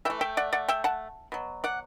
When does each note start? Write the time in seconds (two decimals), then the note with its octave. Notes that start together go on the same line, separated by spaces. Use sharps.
0.05 E3 E5 G5
0.10 A3
0.21 E5 G5
0.37 D5 F#5
0.53 D5 F#5
0.68 E5 G5
0.84 F#5 A5
1.32 B2 F#3
1.64 D5 F#5